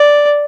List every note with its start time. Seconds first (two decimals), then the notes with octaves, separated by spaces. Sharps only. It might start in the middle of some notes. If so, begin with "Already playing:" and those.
Already playing: D5